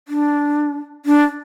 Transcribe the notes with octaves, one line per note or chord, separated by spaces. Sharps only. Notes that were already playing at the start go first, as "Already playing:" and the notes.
D4
D4